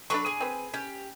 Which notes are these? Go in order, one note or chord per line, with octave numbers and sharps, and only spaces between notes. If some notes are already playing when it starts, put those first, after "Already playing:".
F#3 D4 A4 B4 B5 C#6
G#4 G#5
C4 B4
C#4 G4